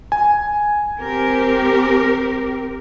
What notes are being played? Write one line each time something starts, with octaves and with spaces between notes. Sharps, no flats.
G#5
C4 G4 A#4